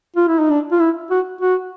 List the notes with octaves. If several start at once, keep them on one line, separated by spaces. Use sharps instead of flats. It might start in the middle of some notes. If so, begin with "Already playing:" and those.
F4
E4
D#4
D4
F4
E4
F#4
F#4